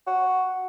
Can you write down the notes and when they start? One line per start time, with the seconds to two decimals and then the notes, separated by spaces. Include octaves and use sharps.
0.07 F#4